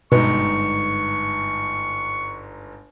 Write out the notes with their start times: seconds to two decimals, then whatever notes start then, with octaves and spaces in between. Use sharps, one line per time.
0.12 G1 G#2 B2 D#4 C#6